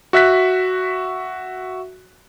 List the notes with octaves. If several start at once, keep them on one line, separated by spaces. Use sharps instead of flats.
F#4 E5 F#6 B6